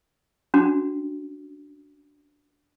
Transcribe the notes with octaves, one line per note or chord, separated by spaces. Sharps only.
C#4 D4 F#4